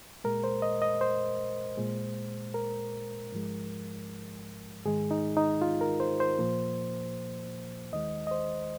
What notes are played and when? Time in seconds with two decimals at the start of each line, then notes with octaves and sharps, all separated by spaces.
0.24 A#2 G#3 A#4
0.44 C5
0.62 D#5
0.82 D#5
1.01 C5
1.77 A#2 G#3
2.54 A#4
3.32 G#2 F3 G#3
4.86 G#2 D#3 G#3 G#4
5.11 D#4
5.37 D#4
5.62 F4
5.81 A#4
6.00 C5
6.20 C5
6.39 A#2 F3 A#3
7.92 D#2 D#3 G#3 D#5
8.27 D#5
8.31 C5